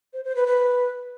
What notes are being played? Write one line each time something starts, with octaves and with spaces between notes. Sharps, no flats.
C5
C5
B4
B4